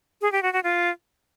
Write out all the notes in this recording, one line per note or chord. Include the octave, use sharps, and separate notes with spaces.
G#4
G4
F#4
F#4
F4